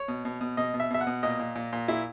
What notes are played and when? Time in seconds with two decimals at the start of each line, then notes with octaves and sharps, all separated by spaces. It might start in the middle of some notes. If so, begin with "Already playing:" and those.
Already playing: C#5
0.08 B2
0.25 B2
0.41 B2
0.57 B2 D#5
0.74 B2
0.80 E5
0.90 B2 E5
1.01 F#5
1.07 B2
1.23 A#2 D#5
1.39 A#2
1.55 A#2
1.73 A#2
1.88 A#2 E4